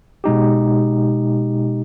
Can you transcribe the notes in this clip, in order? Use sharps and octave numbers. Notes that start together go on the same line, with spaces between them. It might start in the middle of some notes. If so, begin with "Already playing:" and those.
B2 G#3 D#4 G4